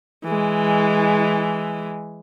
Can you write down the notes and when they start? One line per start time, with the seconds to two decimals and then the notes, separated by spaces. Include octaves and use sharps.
0.24 E3 G#3